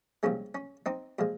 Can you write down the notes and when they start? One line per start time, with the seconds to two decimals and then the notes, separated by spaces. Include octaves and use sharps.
0.23 C2 A#2 F3 G#3 C#4
0.55 C#4
0.86 C4 D#4
1.19 A#2 F3 G#3